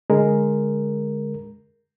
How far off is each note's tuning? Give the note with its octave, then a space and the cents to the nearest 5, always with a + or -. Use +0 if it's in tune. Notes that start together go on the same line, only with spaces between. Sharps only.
D3 -10 G#3 +0 A#4 +0